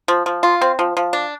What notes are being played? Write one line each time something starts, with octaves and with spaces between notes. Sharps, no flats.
F3
F3
F4
C4
F3
F3
D4